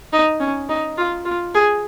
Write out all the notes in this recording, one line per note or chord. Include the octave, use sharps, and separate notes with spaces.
D#4
C#4
D#4
F4
F4
G#4